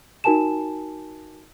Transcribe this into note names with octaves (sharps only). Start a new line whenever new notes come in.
D#4 F#4 A#4 G#5 A5 E7